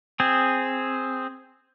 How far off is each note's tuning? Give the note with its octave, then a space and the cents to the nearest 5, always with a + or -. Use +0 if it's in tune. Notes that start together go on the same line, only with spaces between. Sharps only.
C4 +0 G#4 +0